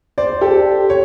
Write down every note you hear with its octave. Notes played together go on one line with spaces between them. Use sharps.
C5 D5
G4 A4
C#5